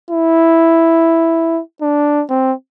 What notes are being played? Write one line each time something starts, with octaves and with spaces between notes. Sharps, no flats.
E4
D4
C4